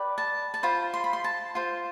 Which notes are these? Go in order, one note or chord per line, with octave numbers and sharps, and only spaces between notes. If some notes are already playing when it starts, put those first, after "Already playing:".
Already playing: G4 B4 D5
A5
A5
F4 C5 B5
C6
B5
C6
A5
F4 C5